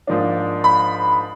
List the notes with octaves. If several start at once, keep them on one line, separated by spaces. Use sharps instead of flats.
G#2 F3 A#3 D4
B5